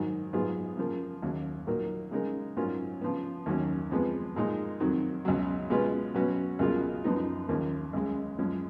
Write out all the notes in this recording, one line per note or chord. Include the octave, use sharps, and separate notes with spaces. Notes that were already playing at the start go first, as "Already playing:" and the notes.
Already playing: G#2 D#3 F#3
G#2 F#3 B3 F4 G#4
C#3 F3 A#3
D#2 C#3 F#3
A#2 F#3 A#3 D#4 A#4
C#3 G#3 D#4 A#4
G#2 F#3 C#4 F4 A#4
C#3 F3 B3
D#2 D#3 F#3 C#4
F2 F3 G#3 B3
A#2 G#3 D#4
F2 D#3 F#3
C#2 B2 F#3
B2 G#3 C#4 F4 B4
B2 F#3 C#4 F#4 B4
C#2 B2 A#3 F4 G#4
F#2 F3 B3 D#4
D#2 C#3 F3 A#3
C#2 C#3 G#3
F#2 F3 G#3 C#4 G#4